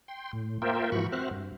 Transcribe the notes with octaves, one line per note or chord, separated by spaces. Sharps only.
G5 C6
A2
A#3 F4 A#4 C5 E5 G5
G#2 E3 F3 F#4 B5 C#6
C4 F#4 C5 E5 F6 F#6
G2